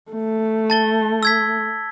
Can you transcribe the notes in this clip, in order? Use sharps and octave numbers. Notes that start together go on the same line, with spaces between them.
A3
A5 A6 G7
E6 G#6 B6